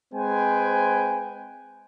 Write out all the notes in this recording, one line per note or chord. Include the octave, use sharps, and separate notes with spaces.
G#3 C4 B4 C5 G5 G#5